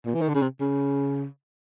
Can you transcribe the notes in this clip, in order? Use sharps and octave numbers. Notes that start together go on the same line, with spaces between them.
A#2
E3
D#3
D3
C#3
C3
C#3